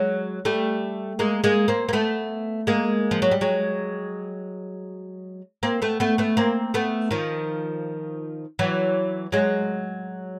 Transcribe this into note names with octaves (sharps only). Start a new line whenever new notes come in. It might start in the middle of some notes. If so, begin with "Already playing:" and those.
Already playing: F#3 G#3
G3 A3
G#3 A#3
G#3 A#3
A#3 C4
A#3
A3 B3
G#3 A#3
F3
F#3
G3
F#3 G#3
A#3 C4
A3 B3
A3 B3
A3 B3
A#3 C4
A3 B3
D#3 F3
E3 F#3
F#3 G#3